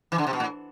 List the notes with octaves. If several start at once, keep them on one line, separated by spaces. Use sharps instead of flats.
E3
D3
C3
B2
A2